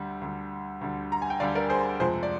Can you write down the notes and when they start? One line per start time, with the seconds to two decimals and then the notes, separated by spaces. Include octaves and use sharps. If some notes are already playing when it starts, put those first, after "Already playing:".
Already playing: D2 D3 G3
0.21 D2 D3 G3
0.81 D2 D3 G3
1.12 A#5
1.22 G#5
1.30 G5
1.40 D2 D3 G3 D5 F5
1.55 A#4 D5
1.69 G#4 C5
2.00 F2 C3 F3 G#3 G#4 C5
2.23 D5